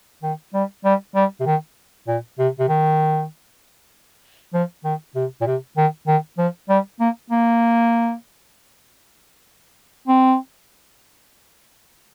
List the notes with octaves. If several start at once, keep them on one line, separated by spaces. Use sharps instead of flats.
D#3
G3
G3
G3
C3
D#3
A#2
C3
C3
D#3
F3
D#3
C3
A#2
C3
D#3
D#3
F3
G3
A#3
A#3
C4